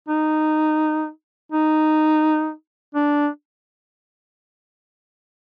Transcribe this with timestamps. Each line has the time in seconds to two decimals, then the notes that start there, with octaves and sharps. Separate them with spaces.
0.08 D#4
1.52 D#4
2.95 D4